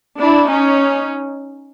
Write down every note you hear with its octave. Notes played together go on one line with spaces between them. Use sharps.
D4 E4
C#4 D#4